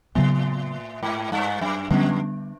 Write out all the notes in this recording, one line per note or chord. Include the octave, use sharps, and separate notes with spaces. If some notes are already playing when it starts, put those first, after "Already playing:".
A2 C#3 F#3 B3
G#2
G2
F#2
F2 D3 G3 B3 D4